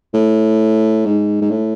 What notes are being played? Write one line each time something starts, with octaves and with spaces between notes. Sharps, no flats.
A2
G#2
G#2
A2